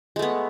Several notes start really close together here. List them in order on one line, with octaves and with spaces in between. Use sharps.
G#3 A3 B3